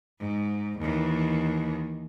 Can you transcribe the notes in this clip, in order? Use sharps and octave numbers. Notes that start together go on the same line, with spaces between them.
G#2
D#2 E3